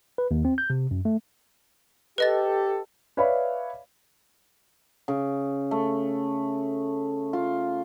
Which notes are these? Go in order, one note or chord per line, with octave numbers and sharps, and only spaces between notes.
B4
D#2
C4
G6
C3
F#2
A3
G4 A4 B4 D#5 A6
B4 C#5 D5 E5 F5 B5
C#3
A3
F4